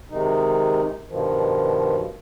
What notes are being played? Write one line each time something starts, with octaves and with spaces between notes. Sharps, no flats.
C3 D#3 G#3 D#4
G2 B2 D#3 F3